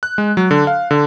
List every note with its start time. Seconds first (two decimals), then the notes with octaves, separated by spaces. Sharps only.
0.03 F#6
0.18 G#3
0.37 F#3
0.51 D3
0.67 F5
0.91 D3